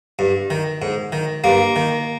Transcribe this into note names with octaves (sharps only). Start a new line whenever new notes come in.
G2
D#3
G#2
D#3
G2 A#3
D#3